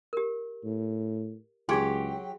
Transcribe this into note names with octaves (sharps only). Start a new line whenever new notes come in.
G4 A#4
A2
C#2 F#3 D4 G4 G#4 C6